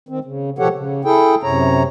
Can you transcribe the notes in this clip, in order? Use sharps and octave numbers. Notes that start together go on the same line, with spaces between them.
D#3 C4
C#3
B2 F3 G4 A4 C#5 F#5
C#3
E4 G#4 A4 G5
F#2 C3 C#5 A#5